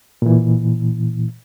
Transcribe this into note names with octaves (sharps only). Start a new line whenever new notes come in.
A#2 E3